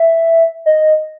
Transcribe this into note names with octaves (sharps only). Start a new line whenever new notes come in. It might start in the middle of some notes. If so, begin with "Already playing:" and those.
Already playing: E5
D#5